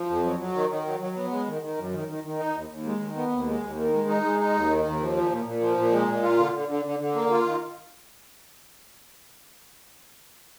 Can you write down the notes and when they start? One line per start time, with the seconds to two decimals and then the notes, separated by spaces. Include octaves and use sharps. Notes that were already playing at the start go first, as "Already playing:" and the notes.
Already playing: F3
0.10 F2
0.24 F#3
0.40 F#3
0.55 D#3
0.70 D#3
0.86 F#3
1.00 F#3
1.17 B3
1.31 G#3
1.47 D#3
1.62 D#3
1.77 F#2
1.94 D#3
2.08 D#3
2.24 D#3
2.39 D#4
2.54 D#2
2.69 D#2
2.85 G#3
3.00 D#3
3.16 B3
3.32 D#2
3.47 G#3
3.63 D#2
3.78 D#3
3.93 G#3
4.08 D#4
4.23 G#3
4.39 D#4
4.55 D#2
4.70 D#3
4.85 D#2
5.00 F3
5.16 A#2
5.31 A#2
5.46 A#2
5.61 F3
5.77 A#2
5.92 G#3
6.08 A#2
6.23 F4
6.38 D3
6.54 D3
6.69 D3
6.85 D3
7.00 D3
7.15 A#3
7.31 F4
7.45 D#3